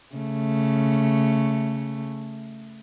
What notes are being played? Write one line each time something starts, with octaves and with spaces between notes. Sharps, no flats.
C#3 A3